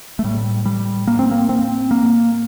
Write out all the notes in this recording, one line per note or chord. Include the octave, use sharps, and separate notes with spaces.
A3
A2 G3
G3
A#3
C4
A#3
C4
A#3